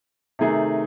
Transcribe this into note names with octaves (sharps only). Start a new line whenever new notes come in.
C3 D#3 A3 D#4 G#4